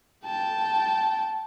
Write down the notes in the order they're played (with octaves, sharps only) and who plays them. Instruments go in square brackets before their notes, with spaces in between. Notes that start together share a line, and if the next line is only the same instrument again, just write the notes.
[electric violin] G5 A5